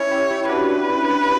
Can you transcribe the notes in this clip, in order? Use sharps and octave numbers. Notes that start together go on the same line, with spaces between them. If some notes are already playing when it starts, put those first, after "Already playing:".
Already playing: C#4 E4 C#5
E4 G4
E4 G4
D4 F#4 B4